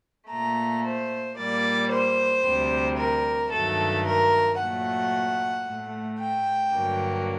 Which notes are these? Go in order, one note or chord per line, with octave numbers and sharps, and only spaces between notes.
A#2 A3 A#5
C5
A#2 G3 A#3 D5
C5
D2 C3 G3
A#4
G2 D#3 F#3 A3 A4
A#4
A#2 F#3 A3 F#5
A2 A3
G5
G2 D3 F#3 A#3